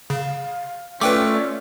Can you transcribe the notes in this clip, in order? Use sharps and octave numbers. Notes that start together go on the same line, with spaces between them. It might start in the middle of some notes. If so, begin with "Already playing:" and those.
C#3 F5
A3 C#4 F4 B4 D5 G5 D6